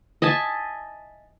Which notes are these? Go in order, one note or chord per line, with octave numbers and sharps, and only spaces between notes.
D#5 E5 G#5 A5